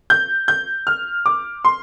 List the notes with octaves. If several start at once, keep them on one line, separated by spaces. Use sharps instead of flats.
G6
G6
F6
D6
C6